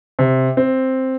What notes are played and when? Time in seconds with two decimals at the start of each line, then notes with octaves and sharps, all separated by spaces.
0.19 C3
0.57 C4